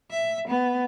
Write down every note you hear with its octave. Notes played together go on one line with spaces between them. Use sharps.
E5
B3